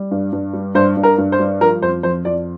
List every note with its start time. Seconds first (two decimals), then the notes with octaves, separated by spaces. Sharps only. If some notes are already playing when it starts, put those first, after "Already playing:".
Already playing: G3
0.11 G2
0.32 G2
0.53 G3
0.75 G2 C5
0.97 G2
1.03 A#4
1.18 G2
1.32 C5
1.39 G3
1.61 F3 A#4
1.82 F2 C5
2.03 F2 C5
2.25 F2 D5